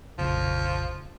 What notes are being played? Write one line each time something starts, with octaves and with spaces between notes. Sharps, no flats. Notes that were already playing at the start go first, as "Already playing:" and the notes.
F1 A#1 C#3 F3